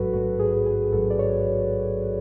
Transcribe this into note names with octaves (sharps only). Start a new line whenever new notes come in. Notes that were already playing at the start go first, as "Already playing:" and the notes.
Already playing: A1 G#2 F#3 F#4 A4 B4
A1 G#2 F#3 F#4
G#4
G#4
A1 G#2 F#3 A4
D5
C#5